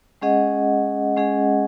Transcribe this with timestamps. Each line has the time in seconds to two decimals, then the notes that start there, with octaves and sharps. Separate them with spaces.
0.21 G#3 C#4 G#4 D#5 F#5
1.16 G#3 C#4 G#4 D#5 F#5